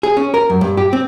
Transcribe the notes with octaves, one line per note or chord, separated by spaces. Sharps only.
G#4
C#4
A#4
F#2
G2
G4
C4